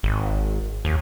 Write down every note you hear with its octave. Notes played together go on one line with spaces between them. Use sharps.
G#1
D#2